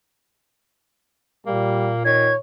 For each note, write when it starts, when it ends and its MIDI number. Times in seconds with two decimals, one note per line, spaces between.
1.46 2.36 46
1.46 1.91 55
1.46 2.01 58
2.05 2.31 51
2.05 2.37 73
2.05 2.33 92